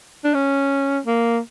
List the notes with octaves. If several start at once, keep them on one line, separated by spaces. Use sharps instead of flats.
D4
C#4
A#3